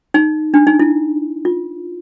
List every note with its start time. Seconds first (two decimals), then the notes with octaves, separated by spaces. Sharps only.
0.14 D#4
0.54 D4
0.67 D#4
0.79 E4
1.45 F4